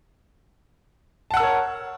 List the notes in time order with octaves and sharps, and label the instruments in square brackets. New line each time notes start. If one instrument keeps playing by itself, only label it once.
[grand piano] A5
F#5
E6
A#4
C#5